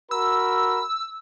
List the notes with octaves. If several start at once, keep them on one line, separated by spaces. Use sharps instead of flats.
F#4 A#4 B5 E6